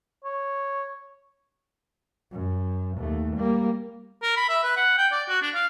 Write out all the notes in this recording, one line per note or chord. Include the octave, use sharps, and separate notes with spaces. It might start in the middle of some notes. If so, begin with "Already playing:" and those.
C#5
F#2
D#2 A3
G3 A#3
A#4
B5
E5
B4
F#5
G5
D5
F#4
D4
F5